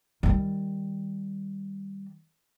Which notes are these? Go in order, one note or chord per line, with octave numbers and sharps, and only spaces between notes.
D#3 G3